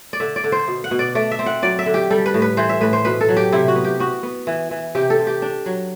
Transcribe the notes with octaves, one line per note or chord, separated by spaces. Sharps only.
D5
D3 E5
D5
D3
C5
B2
F#5
B2
D5
A3 D5
E5
C4
F#5
F#3 D5
E5
D3
G4
G3 A4
B4
A2
B4
E3 C5
E5
A2 B4
C5
B2 B4
A4
F#3
G4
C3 E4
F#4
B3
G4
B3 F#4
B3
E3
E3
C3 G4
A4
C3
G4
D4
F#3